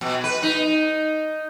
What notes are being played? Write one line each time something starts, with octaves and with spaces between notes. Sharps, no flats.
B2
B4
D#4